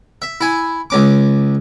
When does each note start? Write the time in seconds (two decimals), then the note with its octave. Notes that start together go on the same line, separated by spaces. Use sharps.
0.22 E5
0.41 E4 G#5
0.90 C#2 C#4 D6